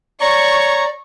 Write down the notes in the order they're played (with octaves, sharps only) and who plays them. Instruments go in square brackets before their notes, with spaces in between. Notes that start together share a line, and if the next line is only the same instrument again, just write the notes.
[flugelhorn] C#5 [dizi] D5 [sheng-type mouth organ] A#5 [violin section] C#6